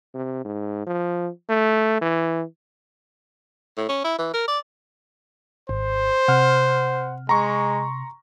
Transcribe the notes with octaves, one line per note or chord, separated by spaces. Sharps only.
C3
G#2
F3
A3
E3
A2
C#4
E4
E3
A#4
D5
G#1 C5
C3 F#5 F6
G#3 A#5 C6 C#6